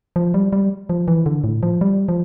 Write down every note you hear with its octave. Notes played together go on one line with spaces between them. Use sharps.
F3
G3
G3
F3
E3
D3
A2
F3
G3
F3